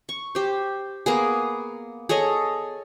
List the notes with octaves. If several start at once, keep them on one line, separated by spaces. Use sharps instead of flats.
C#6
G4 C5
A#3 B3 G#4
G#4 A4 C#5 D#5